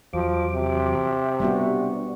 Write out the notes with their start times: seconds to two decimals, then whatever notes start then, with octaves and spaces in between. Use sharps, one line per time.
0.13 E2 F3 F#3 D6
0.53 C3
1.40 G3 B3 D4 F#4